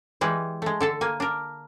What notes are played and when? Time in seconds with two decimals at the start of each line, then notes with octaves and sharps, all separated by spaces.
0.21 E3 G3 G#3 B4
0.62 G#3 A3
0.81 D3 A4 A5
1.01 A#3 G#5
1.20 D4 A#4